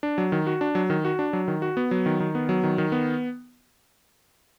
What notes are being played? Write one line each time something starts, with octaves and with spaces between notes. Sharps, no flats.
D4
F#3
D#3
F#4
D4
F#3
D#3
F#4
D4
F#3
D#3
F#4
B3
F#3
D#3
D#3
B3
F#3
D#3
D#3
B3